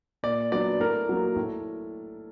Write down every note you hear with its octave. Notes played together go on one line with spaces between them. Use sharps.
A#2 D5
F#3 B3 D4 D5
A2 A#4
F#3 A#3
A2